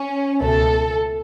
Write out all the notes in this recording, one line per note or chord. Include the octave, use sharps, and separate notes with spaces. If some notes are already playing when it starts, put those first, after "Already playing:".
Already playing: C#4
C#2 B2 A3 A4